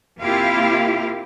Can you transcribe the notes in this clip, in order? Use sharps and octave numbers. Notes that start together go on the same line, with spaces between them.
C3 A#3 E4 F4 G4 F5